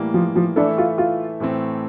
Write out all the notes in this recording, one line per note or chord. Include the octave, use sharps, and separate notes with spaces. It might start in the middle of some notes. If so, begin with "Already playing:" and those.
Already playing: A2 E3 G3 A#3
F3
F3
E3 A3 D4 E4 A4
F4
F4
A2 E3 A3 C4